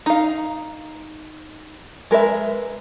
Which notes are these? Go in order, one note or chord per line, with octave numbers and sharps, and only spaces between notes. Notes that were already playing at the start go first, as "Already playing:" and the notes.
D#4 F5
G#3 A#4 B4 E5